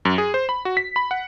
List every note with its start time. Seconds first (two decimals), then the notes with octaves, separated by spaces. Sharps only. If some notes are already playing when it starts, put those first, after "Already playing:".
0.05 F#2
0.18 G#4
0.34 C5
0.49 B5
0.65 F#4
0.77 B6
0.96 B5
1.11 F#5